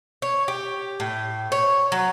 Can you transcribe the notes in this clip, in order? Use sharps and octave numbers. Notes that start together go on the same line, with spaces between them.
C#5
G4
A2
C#5
F#3